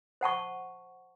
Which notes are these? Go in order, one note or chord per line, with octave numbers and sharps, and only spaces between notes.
C5 F#5 A5 C#6